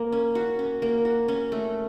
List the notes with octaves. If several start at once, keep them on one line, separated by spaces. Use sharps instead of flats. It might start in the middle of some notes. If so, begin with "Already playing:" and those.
Already playing: A#3
C#4
F#4
C#4
A#3
F#4
C#4
A3